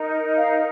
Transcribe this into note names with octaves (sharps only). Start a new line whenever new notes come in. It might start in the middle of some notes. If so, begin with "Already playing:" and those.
Already playing: D#4 A#4
F5